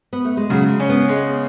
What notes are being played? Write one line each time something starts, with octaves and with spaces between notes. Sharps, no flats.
B3
A3
G#3
C#3 F#3
G#3
C#4
B3
G#3